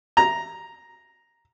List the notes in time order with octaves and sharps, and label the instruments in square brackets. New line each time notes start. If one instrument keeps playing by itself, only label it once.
[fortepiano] A#5